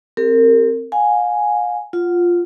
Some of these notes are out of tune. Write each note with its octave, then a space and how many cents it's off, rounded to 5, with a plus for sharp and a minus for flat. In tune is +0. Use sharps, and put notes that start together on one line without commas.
C4 +0 G4 +20 A#4 -30
F5 +40 G#5 +0
F4 +0 F#5 +0